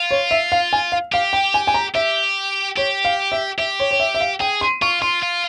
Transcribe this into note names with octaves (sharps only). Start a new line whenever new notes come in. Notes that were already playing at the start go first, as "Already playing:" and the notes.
Already playing: F4
C#5
E5
F5
G#5
F5
G4 F5
G5
G#5
G#5
A#5
G4 E5
G4 C#5
F5
E5
G4 E5
C#5
C#5
E5
E5
F5
G#4 G5
C6
F4 C#6
F4 C6
F4